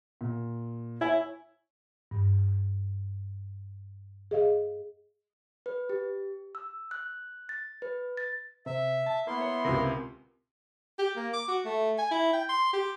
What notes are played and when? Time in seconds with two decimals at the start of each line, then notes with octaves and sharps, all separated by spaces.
0.21 A#2
1.01 E4 C#5 G#5
2.11 G2
4.31 G#4 D#5 F5
5.66 B4
5.89 G4
6.55 E6
6.91 F#6
7.49 A6
7.82 B4
8.17 A6
8.66 C3 E5
9.06 A5
9.27 A#3 B3 E4 C6
9.41 C#5
9.65 C#2 C3 A#4
10.99 G4
11.16 A#3
11.33 D6
11.48 F#4
11.65 A3
11.98 G#5
12.11 E4
12.33 G5
12.49 C6
12.73 G4